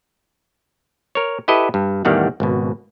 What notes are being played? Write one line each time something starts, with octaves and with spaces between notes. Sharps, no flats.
A#4 C#5
E4 G4 A4 B4 D#5
G2
A1 E2 D#3 G3 F5 F#5
G#1 C#2 B2